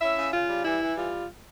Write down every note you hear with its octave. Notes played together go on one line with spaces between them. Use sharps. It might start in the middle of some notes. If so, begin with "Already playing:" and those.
C#4 E4 E5
C#3
C#3 F4
G3
E3 E4
E3
G3 F4